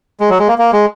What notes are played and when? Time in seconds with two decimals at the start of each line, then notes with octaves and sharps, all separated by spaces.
0.20 G#3
0.30 F#3
0.39 G#3
0.48 A#3
0.58 A#3
0.73 G#3